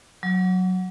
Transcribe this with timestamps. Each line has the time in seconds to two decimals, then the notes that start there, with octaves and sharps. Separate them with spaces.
0.23 F#3